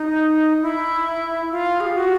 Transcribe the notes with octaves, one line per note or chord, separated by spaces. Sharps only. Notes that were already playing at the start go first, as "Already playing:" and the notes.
Already playing: D#4
E4
F4
G#4
G4
F#4